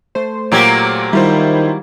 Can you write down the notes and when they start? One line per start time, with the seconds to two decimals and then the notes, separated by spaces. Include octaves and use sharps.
0.15 A3 C5
0.52 A#2 F#3 A#3 G4
1.13 D#3 G3 E4 F4 C5